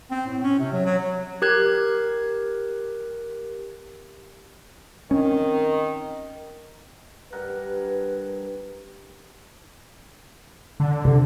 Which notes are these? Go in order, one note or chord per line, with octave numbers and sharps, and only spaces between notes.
C4
A2
C#4
C3
F#3
F#3
F#3
G4 A#4 F#6 G#6
D#3 C4 C#4
G2 A#4 B4 F#5
D3
C3